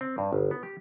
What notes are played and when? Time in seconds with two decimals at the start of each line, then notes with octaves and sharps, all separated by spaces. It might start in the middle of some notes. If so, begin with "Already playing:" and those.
0.01 C4
0.18 G2
0.33 G1
0.51 B3
0.63 G4